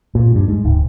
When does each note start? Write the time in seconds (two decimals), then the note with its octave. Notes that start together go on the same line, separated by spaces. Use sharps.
0.15 A#2
0.35 G2
0.48 G#2
0.65 D1